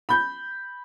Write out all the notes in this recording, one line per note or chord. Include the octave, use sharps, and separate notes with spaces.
B5 G6